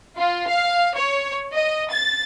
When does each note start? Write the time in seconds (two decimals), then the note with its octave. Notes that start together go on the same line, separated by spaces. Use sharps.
0.17 F4
0.49 F5
0.96 C#5
1.54 D#5
1.90 A6